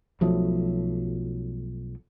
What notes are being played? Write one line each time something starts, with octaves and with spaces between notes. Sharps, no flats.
B1 F3 F#3 A3